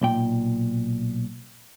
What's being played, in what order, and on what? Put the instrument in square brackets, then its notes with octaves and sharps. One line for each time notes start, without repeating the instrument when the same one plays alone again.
[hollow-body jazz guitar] B1 A#2 G5